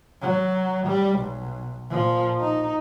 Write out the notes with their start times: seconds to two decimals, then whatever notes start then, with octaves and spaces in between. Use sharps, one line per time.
0.22 F#3
0.86 G3
1.19 B1
1.91 A#2 F3
2.41 D#4